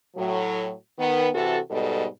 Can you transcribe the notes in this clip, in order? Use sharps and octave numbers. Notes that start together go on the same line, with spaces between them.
A2 F#3
D#3 B3
C3 E3 F#4 A4
G#2 B2 G3 A4 D#5